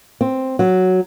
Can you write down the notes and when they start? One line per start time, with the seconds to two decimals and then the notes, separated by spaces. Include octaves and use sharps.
0.21 C4
0.59 F#3